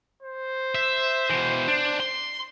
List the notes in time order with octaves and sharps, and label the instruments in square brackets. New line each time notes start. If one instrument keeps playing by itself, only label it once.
[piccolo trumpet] C5
[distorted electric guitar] E5
B2 E3
D4
C6